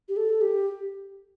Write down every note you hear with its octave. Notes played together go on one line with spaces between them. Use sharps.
G4
A4
G4